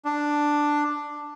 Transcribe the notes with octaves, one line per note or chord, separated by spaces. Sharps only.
D4